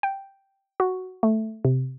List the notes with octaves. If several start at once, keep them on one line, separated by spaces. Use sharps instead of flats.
G5
F#4
A3
C3